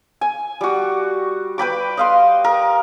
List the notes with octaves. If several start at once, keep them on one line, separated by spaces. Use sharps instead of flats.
G#5
G3 F#4
B4 G5 B5 D6
D#5 F5 C6
A#4